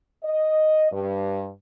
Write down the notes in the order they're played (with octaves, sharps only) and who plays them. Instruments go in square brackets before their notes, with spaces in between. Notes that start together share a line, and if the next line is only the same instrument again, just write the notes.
[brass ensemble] D#5
G2